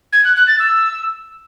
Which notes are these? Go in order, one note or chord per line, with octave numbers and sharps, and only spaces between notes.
G#6
F#6
F#6
A6
E6